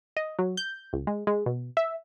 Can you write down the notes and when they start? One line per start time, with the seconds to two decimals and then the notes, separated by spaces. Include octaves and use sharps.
0.17 D#5
0.39 F#3
0.57 G6
0.93 C#2
1.07 G#3
1.27 G#3
1.46 B2
1.77 E5